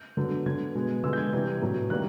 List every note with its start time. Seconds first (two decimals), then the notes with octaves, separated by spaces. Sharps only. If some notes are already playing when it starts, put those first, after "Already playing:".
Already playing: G6
0.17 D3 F#3 B3
0.46 D3 F#3 B3 G#6
0.75 B2 G#3 B3
1.03 D3 F3 G#3 B3 E6
1.13 G6
1.17 G#6
1.33 C3 E3 G3
1.62 A2 F#3 B3
1.90 D#3 G3 A#3 F#6